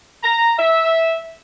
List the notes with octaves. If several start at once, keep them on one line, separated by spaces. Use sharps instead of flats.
A#5
E5